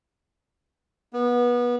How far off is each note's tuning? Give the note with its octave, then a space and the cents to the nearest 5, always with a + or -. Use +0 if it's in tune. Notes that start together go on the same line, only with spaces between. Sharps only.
B3 -25